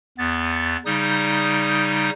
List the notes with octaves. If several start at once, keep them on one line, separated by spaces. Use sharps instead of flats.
E2 B3 A6
C#3 G3 D#4 D#6 G6